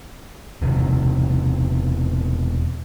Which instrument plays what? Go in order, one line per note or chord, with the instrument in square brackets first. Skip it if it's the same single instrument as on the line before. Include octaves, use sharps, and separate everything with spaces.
[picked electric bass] E1 C3 D#3